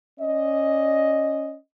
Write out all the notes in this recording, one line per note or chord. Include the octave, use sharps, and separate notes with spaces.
C#4 D5 D#5